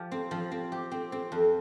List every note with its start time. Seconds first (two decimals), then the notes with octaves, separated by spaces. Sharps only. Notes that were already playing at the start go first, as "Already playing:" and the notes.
Already playing: F3 G4
0.12 C4
0.31 F3
0.52 C4
0.72 G4
0.92 C4
1.12 C4
1.32 F2